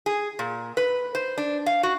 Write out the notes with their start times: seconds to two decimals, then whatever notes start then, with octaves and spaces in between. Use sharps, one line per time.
0.06 G#4
0.39 A#2
0.77 B4
1.15 C5
1.38 D4
1.66 F5
1.83 F#4